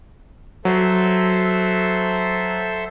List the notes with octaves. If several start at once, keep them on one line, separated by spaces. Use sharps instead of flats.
F#3 A4 C5 E5